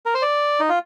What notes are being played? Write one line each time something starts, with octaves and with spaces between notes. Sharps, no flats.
A#4
C5
D5
D#4
F4